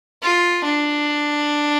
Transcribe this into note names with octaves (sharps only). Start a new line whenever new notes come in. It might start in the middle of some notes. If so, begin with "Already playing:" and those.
F4
D4